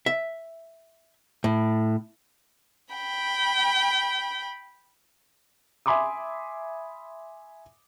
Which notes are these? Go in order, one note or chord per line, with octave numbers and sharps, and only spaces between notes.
E5
A2
G5 B5
E5 G#5 B5 C6 D6 D#6